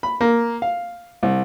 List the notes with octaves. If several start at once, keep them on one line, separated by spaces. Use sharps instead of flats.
B5
A#3
F5
C2